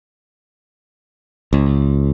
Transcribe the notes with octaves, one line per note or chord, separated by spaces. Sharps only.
C#2